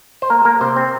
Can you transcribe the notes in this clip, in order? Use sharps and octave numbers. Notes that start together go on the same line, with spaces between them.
C5
A#3 A#4
A#3 A#4
C3 C5
C4